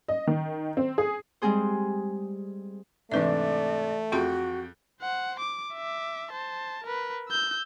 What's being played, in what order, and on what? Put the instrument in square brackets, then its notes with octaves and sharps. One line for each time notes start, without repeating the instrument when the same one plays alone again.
[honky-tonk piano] D#5
D#3
C4
G#4
[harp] G3 G#3 C4 G#4 C5
[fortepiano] G#2 C3 D4 [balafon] E3 B4 E5 [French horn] A3 [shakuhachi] D5
[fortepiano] F2 G5 [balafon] F4 G#4 C6 [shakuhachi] F#4
[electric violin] C5 F#5
D6
E5 D6
C5 A5
A#4 B4
E6 G6